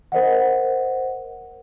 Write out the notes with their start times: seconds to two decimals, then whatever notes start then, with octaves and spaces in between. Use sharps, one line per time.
0.12 A#4 C5 D#5 F#5